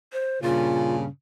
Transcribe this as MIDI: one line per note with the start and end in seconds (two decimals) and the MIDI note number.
0.13 0.41 72
0.42 1.07 43
0.42 1.07 46
0.42 1.07 49
0.42 0.96 65